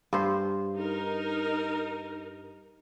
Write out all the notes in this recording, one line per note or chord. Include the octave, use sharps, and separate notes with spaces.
G2 C5
D#4 A#4